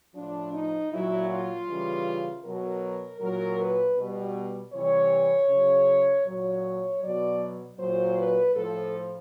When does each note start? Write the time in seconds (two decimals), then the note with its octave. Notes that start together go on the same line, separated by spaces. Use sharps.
0.15 A2 F3 D4
0.54 D#4
0.91 A#2 F#3 E4
1.30 F4
1.67 C#3 E3 G3
2.44 B2 F#3 A#4
3.21 A#2 F#3 A#4
3.59 B4
3.97 B2 G3
4.72 C3 E3 G3 C#5
5.49 C#3 F#3
6.25 A#2 F#3 C#5
7.01 B2 F#3 D5
7.77 A#2 F#3 C5
8.17 B4
8.54 A2 F3 A4